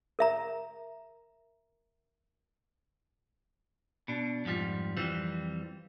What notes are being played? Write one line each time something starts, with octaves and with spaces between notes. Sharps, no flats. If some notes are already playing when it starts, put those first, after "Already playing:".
A#4 E5 A#5
B2 D4
F2 G#2 F3 G3
F2 E3 G3 C4